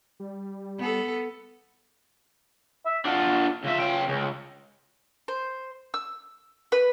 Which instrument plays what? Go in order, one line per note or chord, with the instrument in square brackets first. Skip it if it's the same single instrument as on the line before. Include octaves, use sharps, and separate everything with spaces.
[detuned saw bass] G3
[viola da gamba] B3 A4
[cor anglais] E5
[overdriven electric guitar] D4 F4 [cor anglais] F#5
[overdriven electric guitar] C#2 E5 [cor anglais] F4
[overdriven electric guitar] C#3 G5
[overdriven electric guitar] C#2 [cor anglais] G#4
[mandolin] C5
E6
B4